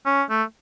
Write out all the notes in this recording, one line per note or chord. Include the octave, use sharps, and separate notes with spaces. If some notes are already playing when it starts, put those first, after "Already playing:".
C#4
A3